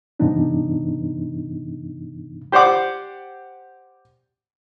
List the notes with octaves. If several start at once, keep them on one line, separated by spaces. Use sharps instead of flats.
G2 C3 E3 B3 D4 D#4
G4 C5 D5 F#5 D6